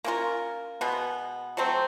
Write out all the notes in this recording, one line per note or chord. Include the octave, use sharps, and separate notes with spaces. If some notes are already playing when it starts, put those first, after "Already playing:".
A#3 C#4 F4 A#4
B2 G#3 B3
F#3 A3 C4